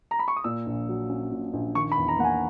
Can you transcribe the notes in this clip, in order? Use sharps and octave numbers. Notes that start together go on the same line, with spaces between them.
A#5
B5
C#6
D#6
A#2 E6
A#1
F#3
C#4
A#2
A#1
D#3 C#6
B5
E2
A#5
A#3 F#5
G#5